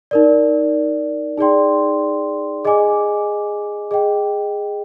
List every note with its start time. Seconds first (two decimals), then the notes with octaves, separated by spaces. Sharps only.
0.11 D#4 A#4 D5
1.38 D#4 G#4 D5 G5 C6
2.65 G#4 D#5 G#5 D6
3.91 G#4 D#5 G5